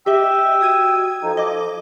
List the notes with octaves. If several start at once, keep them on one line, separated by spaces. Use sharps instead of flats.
G4 D#5 E5 G5 E6
F#4 D#6 G#6 D#7
F3 D#4 A4
F3 D#5 D6